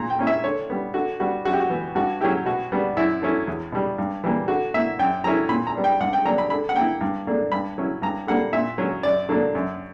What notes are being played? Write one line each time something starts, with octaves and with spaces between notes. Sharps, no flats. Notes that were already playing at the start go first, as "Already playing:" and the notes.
Already playing: A#2 A#5
G5
A#3 C#4 E4
E5
D3 C#5
G3 B3
D3 F#4
G3 B3 F#4
F#2 F#4
G4
F#4
E3 B3
G2 F#4
F#3 C#4 E4 G4
B2 F#4
G3 B3 D4
F#2 E4
D3 F#3 C#4 E4
E2
B2 G3
G2
E3 G3 A#3
D3 F#4
A#3 E4 E5
F#2 G5
D3 F#3 C#4 E4 A#5
A#2 B5
A#5
G3 B3 D4
G5
G2 F#5
G5
F#3 A#3 D4 A#5
B5
D3 B5
F#5
A#3 E4 G5
G2
D3 A#3 D4
G2 B5
F#3 C#4 E4
G2 A#5
D3 G3 A#3 F#5
A#2 E5
F#3 C#4
F#2 D5
D3 F#3 A#3 D4
F#2